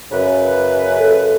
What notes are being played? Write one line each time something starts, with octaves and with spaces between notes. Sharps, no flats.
F#2 C#3 B4
A4